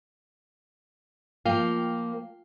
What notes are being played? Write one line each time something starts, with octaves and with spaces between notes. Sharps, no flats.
F3 A#3 F4 F5 G5